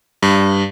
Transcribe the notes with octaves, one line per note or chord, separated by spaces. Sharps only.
G2